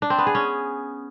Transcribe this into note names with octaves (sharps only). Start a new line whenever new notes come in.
D4
C4
B3
G#4
C#4